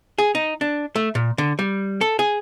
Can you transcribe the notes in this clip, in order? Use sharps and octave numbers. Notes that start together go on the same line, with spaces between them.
G#4
D#4
D4
A3
A#2
D3
G3
A4
G#4